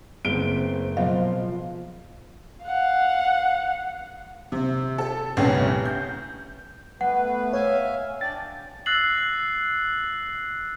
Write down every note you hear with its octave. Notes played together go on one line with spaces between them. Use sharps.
F#1 B3 C4 D7 G7
B2 F3 F#3 F4 D#5 F5
F5 F#5
C3
A4
G1 C2 A3 B3 C#4 G4
G6
A3 B3 B4 F#5
C#5 E5 F5 G#5
D4 D5 G5 A6
E6 F#6 A6 A#6 C7 F#7